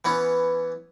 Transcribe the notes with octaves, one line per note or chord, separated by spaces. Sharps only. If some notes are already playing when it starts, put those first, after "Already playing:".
E3 B3 C#4